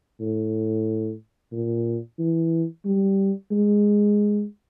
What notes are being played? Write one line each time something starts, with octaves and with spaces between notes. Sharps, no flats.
A2
A#2
E3
G3
G#3